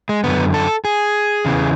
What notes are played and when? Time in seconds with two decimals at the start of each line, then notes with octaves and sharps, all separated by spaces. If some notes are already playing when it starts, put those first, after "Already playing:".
0.09 G#3
0.24 F#2 D3 B3
0.54 A4
0.85 G#4
1.45 E2 C#3 E3